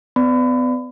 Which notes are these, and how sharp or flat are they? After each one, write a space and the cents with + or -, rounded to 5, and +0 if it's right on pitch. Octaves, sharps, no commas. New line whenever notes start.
B3 +35 D5 +0 B5 +30